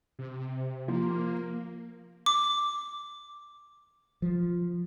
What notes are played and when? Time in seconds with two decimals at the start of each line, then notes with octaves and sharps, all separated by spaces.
0.19 C3
0.88 F3 A#3
2.26 D6
4.22 F3